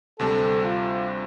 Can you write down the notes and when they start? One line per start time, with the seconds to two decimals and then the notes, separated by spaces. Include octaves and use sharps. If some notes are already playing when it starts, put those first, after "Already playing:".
0.19 D2 C3 G3 C4 A4
0.63 F4